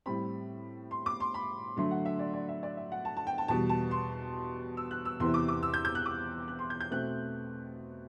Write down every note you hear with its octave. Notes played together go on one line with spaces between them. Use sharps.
A2 G3 C4 B5
C6
D6
C6
B5
D3 F#3 A3 C6
F#5
E5
D5
D5
E5
D5
E5
F#5
A5
A5
G5
A5
E2 B2 G3 A5
A5
C6
E6
F#6
E6
E2 C3 E3 C6
D6
D6
E6
G6
G6
F#6
D6
F#6
C6
G6
G6
B2 A3 C4 F#6